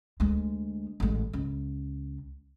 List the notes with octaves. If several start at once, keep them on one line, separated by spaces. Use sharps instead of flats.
D2 G#3
A1 G#3
C#2